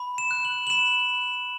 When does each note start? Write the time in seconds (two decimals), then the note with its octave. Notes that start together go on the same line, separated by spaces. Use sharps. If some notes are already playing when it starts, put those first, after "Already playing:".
Already playing: B5
0.18 E7
0.31 F#6
0.45 F#7
0.67 F#7
0.70 B5 E7